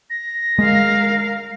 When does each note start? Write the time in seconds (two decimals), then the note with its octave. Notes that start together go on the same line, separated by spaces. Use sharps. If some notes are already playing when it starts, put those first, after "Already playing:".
0.10 A#6
0.59 G#3 A#4 F5